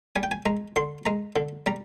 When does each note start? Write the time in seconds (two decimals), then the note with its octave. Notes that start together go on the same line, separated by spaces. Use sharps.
0.16 G3 G#5
0.23 G5
0.31 G#5
0.46 G#3 A#5
0.76 D3 C6
1.06 G#3 A#5
1.36 D3
1.66 G3 A#5